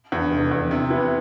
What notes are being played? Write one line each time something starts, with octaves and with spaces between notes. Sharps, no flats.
E2 D3
F1
E2 D3
C3
E3 B3